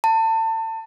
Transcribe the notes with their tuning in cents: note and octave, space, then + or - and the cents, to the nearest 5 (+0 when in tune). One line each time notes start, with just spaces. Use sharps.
A5 +30